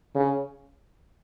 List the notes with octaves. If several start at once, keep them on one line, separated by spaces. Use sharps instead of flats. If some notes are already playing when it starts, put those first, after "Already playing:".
C#3